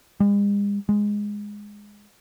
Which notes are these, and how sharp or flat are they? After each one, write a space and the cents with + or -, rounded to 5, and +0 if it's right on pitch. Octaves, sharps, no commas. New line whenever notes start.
G#3 -45
G#3 -5